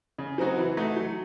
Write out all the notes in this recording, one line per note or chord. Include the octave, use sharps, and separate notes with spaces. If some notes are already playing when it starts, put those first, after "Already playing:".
C#3
F#3 C4 D#4 F#4
E3
A3 D#4 F#4
F#3